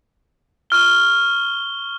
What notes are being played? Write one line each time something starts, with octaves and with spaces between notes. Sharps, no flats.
C#6 F6 G7